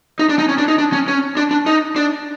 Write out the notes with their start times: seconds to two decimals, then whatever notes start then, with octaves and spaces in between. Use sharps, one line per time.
0.19 D#4
0.29 D4
0.39 D#4
0.49 C#4
0.58 D4
0.68 D#4
0.78 D4
0.93 C#4
1.08 C#4
1.37 D4
1.51 D4
1.66 D#4
1.96 D4